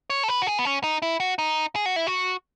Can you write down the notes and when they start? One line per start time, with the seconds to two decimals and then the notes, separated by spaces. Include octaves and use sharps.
0.10 C#5
0.23 A4
0.28 B4
0.42 F#4
0.47 G#4
0.59 B3
0.65 C#4
0.84 D#4
1.02 E4
1.20 F#4
1.39 D#4
1.76 G#4
1.86 F#4
1.96 E4
2.07 F#4